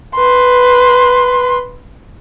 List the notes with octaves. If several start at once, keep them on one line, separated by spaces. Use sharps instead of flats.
B4 C6